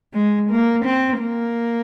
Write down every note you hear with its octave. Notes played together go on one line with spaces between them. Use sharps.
G#3
A#3
C4
A#3